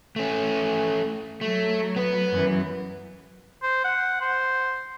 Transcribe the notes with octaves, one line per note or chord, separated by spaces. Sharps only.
A3 C#4
F#3 A3
B3 B4
F#2 E3
C5
F#5
C5